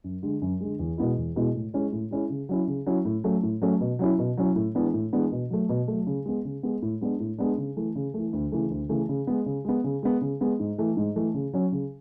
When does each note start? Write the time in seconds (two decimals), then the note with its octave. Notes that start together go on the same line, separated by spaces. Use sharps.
0.04 F#2
0.23 D3 G#3
0.42 F#2
0.61 D3 G#3
0.79 E2
0.98 B2 G#3 B3 E4
1.17 E2
1.36 B2 G#3 B3 E4
1.55 A2
1.74 G#3 C#4 E4
1.92 A2
2.11 G#3 C#4 E4
2.30 C#3
2.49 F#3 C#4 E4
2.68 C#3
2.86 F#3 C#4 E4
3.05 A2
3.24 F#3 A3 C#4
3.43 A2
3.62 F#3 A3 C#4
3.81 B2
3.99 F#3 C#4 E4
4.19 B2
4.37 F#3 C#4 E4
4.56 A2
4.75 E3 G#3 B3 D4
4.94 A2
5.13 E3 G#3 B3 D4
5.32 B2
5.50 F#3 A3
5.69 B2
5.88 F#3 A3
6.07 C#3
6.26 G#3 B3
6.45 C#3
6.63 G#3 B3
6.82 A2
7.01 G#3 B3 D4
7.20 A2
7.39 G#3 B3 D4
7.58 C#3
7.77 E3 A3
7.95 C#3
8.14 E3 A3
8.33 D2
8.52 C#3 E3 A3
8.70 D2
8.89 C#3 E3 A3
9.09 C#3
9.27 G#3 B3
9.46 C#3
9.65 G#3 B3
9.84 C#3
10.03 G#3 B3
10.21 C#3
10.41 G#3 B3
10.60 G#2
10.78 E3 A3
10.97 G#2
11.16 E3 A3
11.34 C#3
11.53 F#3 C#4
11.72 C#3